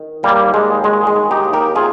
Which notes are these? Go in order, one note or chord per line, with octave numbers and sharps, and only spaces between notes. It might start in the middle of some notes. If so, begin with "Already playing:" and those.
Already playing: D#3
D#2 G3 A#3
D#2 G#3
D#3 G#3
G#3
D#3
D#4 G4
D#2
G4 A#4
C3 F4 G#4